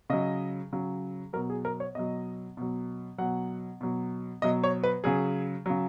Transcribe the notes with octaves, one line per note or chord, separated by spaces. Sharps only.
C#3 F#3 D#5
C#3 F#3
B2 F#3 A#4
G#4
A#4
C#5
B2 F#3 D#5
B2 F#3
B2 F#3 F#5
B2 F#3
B2 F#3 D#5
C#5
B4
C#3 F#3 G#4
C#3 F#3